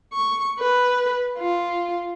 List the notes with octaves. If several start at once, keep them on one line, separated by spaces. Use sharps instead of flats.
C#6
B4
F4